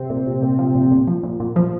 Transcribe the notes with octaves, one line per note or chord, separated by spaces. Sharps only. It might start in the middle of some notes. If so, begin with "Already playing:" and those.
Already playing: C3 C4
A#2
A#2
A#2
F3
A#2
A#2
F3
A#2
A#2
F3